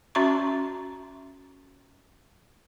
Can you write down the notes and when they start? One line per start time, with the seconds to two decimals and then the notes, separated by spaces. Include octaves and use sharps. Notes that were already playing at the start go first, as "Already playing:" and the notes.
0.15 C#4 F#4 E5 A#5 C6 C#6